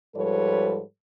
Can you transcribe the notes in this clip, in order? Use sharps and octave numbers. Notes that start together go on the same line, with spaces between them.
G#2 F3 G3 A4 B4 C#5